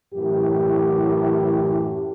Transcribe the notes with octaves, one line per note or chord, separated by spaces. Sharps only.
F#2 A2 E3 G4